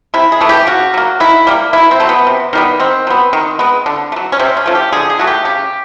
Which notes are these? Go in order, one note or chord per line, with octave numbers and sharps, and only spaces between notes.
C3 E4
G#4
E3 A3
G4
C#3 F#4
F#3 A#3
D#3 E4
G3 A#3
B2 E4
C4
F#3 A3
B3
C3
D#3 G3 B3
D#3 C4
F#3 B3
D#3
G#3 B3
D3
A3
F#3
C#4
C3 C4
C#4
F3 A3
G4
D3 G#4
G#4
F#3 A3 F#4
G4
C#3 G4